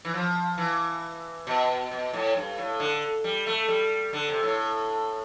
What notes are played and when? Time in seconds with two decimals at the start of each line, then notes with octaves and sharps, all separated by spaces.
0.05 E3
0.14 F3
0.58 E3
1.47 B2
1.91 B2
2.13 A2
2.35 G2
2.58 A2
2.80 D3
3.24 G3
3.47 A3
3.68 G3
4.13 D3
4.28 C3
4.43 A2